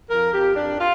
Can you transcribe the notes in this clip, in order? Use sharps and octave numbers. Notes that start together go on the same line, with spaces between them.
F2 A#4
F2 G4
F2 D4
F4